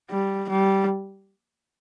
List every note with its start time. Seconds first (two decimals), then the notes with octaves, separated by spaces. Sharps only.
0.11 G3
0.50 G3